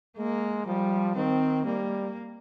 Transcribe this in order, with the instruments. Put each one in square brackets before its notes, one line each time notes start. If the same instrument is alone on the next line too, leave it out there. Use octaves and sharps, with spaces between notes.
[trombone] G#3 [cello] A#3
[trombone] F3 [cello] G3
[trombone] D#3 [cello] C4
[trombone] G3 [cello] A#3